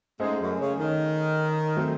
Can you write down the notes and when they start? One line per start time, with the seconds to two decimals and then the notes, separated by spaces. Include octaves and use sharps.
0.19 G#2 G#3 A3 C#4 G#4 C5 D#5
0.39 F#2 F#3
0.59 C#3
0.78 D#3
1.76 F#3 A3 C4